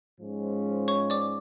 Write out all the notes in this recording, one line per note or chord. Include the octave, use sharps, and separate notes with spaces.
G#2 F3 G#3 C#4
C#5 C#6
D5 D6